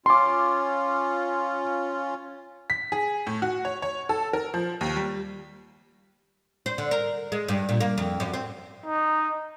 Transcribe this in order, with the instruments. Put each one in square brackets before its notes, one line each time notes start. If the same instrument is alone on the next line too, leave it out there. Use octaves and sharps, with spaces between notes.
[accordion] C#4 F4 [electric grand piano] C6 D6
[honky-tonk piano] B6
G#4
A2
F#4
C#5
C#5
A4
A#4
F3
D#2
G3
[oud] C5
D3
A#4
G#3
G2
A#2
A#3
F2
F#2
C4
[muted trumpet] D#4